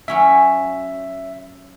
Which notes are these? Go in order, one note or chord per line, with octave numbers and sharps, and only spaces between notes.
F#3 C#4 E4 E5